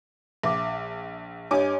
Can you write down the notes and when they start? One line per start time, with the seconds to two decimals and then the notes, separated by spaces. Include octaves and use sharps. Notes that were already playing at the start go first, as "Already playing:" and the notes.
0.43 A#1 E5 D6 D#6
1.51 G2 C#5 D#5 G#5 D6 D#6